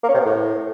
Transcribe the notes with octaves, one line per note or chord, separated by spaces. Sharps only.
A#3
C#4
C3
B3
A2